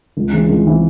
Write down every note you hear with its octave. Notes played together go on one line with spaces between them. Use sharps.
C#2
C#3 E3 G#3 C4
C#2
C#3 E3 G#3 C4